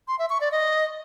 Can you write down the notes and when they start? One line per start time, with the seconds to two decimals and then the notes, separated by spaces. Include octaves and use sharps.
0.08 C6
0.19 E5
0.30 C#6
0.41 D5
0.52 D#5